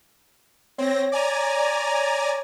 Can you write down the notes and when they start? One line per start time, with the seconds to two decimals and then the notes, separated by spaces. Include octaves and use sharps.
0.78 C4 C#5 A#6
1.12 D5 G#5 A#5